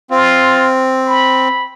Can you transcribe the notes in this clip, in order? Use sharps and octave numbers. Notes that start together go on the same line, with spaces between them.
C4 F4
B5